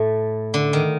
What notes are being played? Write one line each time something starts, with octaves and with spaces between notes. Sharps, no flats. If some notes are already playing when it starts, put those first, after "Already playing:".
Already playing: A2 A3
D3
D#3